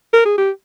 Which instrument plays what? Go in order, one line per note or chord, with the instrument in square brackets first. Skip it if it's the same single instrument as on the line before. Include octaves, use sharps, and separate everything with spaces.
[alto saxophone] A#4
G#4
G4